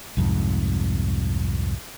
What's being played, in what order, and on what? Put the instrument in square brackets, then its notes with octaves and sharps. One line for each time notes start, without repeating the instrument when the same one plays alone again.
[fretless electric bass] C2 F2 G#2